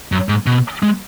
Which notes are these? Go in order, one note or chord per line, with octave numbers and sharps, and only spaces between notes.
F#2
G#2
B2
G#3